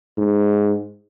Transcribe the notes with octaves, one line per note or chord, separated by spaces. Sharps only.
G#2